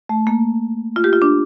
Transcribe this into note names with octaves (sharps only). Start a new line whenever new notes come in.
A3
A#3
F4
G4
F4
D4